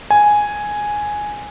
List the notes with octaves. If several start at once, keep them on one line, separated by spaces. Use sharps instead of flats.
G#5